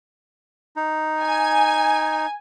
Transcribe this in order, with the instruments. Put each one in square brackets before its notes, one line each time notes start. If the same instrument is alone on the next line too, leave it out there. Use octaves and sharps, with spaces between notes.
[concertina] D#4
[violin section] G#5